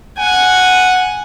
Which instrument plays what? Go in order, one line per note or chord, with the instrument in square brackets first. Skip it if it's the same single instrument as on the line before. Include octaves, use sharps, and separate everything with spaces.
[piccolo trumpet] F#5 [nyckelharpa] G#5